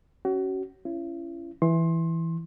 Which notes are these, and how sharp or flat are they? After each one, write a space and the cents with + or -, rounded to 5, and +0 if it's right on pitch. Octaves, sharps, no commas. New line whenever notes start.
C#4 +0 F#4 +30
C#4 +0 E4 +40
E3 +0 C6 +25